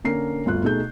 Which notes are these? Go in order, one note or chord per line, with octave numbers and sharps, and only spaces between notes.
D3 A#3 C#4 A#4 A#5 C7
G1 D2 F4 F#6
B2 A3 D#4 G#4 G6